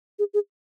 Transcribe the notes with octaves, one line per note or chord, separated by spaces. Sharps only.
G#4
G#4